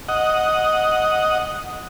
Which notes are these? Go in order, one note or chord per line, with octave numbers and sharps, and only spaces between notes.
D#5 F#5